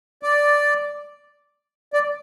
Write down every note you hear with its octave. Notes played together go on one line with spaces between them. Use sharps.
D5
D5